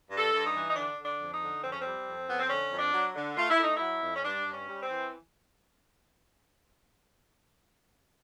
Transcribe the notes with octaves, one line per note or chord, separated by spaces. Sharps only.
G2
A4
G2
D#4
E3
D#4
D3 D4
D3
D4
F2
D#4
D3
F2 C4
C#4
G3 C4
F2
F2 B3
C4
D3 C#4
F2
D4
F#3
D3
A3 F4
E4
A3 D#4
F#3 E4
F2
C#4
G2 D4
G2
C#4
G3
C4
E3